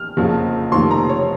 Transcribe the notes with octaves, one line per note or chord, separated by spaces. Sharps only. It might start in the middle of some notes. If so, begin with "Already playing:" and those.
Already playing: F6
F#1 F2 C#3
F1 F2 D#3 A#3 C6
A#5
C#5